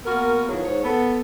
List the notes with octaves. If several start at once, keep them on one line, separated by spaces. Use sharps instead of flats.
A#3 B3 F#4 A#4
D#3 F3 F#3 B3 E4 G#4
G#2 C#5
B3 A4